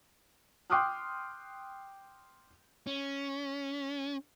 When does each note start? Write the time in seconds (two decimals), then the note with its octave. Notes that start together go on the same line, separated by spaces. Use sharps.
0.70 G5 C6 D6 D#6 F6 F#6
2.87 C#4